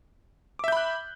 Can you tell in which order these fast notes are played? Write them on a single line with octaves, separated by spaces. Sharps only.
D6 E5 G6 B5 F#6